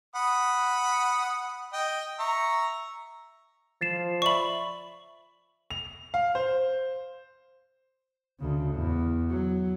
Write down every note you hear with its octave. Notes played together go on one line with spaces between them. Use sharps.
F#5 B5 D#6
D#5 G5
E5 A#5 C#6
F3 A6 C7 E7
D5 E5 B5 C#6 F#7
F7
F5
C5
D2 C#3
E2
F#3